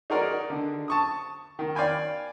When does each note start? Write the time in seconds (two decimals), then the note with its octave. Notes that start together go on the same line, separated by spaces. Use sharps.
0.10 D#4 F#4 G#4 A#4 D5
0.50 D3
0.88 A5 C#6 D#6
1.59 D#3
1.75 D5 F5 G5 G#5 B5